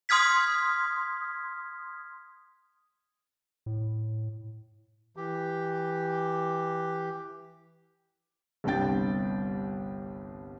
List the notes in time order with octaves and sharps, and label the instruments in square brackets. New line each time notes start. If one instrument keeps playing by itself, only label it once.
[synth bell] C6 D#6 F6 G#6 B6
[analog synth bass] A2
[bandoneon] E3 G4
[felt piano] G1 C2 G3 D4 G5 A6